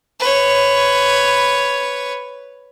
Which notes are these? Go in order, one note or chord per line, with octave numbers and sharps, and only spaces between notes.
B4 C#5